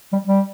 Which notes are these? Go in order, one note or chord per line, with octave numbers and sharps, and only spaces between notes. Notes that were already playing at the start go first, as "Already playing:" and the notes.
G3
G3